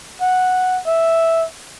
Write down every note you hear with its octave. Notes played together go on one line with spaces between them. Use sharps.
F#5
E5